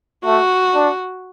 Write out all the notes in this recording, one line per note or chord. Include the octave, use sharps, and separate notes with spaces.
A3 F#4
D4